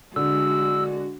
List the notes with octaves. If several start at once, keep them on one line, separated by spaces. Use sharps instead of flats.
D3 G#3 F#4 E6